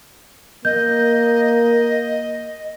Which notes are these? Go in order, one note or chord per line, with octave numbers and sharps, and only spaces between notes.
A#3 D#5 G6